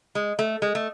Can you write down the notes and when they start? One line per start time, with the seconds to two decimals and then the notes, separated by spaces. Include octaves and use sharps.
0.15 G#3
0.39 A3
0.62 G#3
0.75 A3